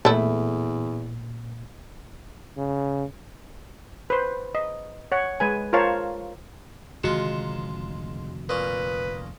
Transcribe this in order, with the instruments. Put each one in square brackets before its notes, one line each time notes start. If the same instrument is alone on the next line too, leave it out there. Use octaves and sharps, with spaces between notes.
[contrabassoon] E2 [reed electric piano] A#2 [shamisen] A3 E4
[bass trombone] C#3
[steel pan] B4 C5
D#5
C#5 F#5
G#3 B4 G#5
F4 A#4 C5 C#5 F5 A5
[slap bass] F1 D3 [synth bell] D#3 F#4 E7 [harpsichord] G#3 F4
[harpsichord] A#2 C#4 [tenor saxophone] B4 [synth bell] D#6